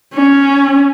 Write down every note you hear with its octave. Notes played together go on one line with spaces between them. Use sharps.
C#4